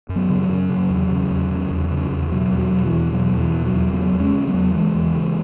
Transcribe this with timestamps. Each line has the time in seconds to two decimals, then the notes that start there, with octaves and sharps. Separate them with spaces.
0.09 F#2
0.16 F#3 B3
0.30 C#3
0.43 F#3
0.49 F#2
0.69 C#3
0.90 E2
1.10 C#3
1.31 E2
1.51 C#3
1.70 E2
1.91 C#3
2.11 E2
2.31 B2 F#3
2.52 E2
2.58 F#3
2.72 B2
2.86 E3
2.92 E2
3.12 B2 F#3
3.33 E2
3.39 E3
3.53 B2
3.66 F#3
3.73 E2
3.93 C#3 F#3 B3
4.14 E2
4.20 G#3 C#4
4.34 C#3
4.47 F#3 B3
4.54 E2
4.74 C#3 E3 G#3
4.95 E2
5.15 C#3